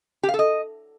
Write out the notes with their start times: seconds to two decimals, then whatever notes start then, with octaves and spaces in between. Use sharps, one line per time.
0.23 G4
0.29 F5
0.34 A4
0.39 D#5